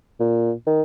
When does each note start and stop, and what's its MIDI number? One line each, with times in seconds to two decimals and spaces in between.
0.20 0.52 46
0.67 0.82 51